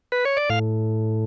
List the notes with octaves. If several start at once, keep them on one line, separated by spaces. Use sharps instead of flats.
B4
C#5
D5
A2 F5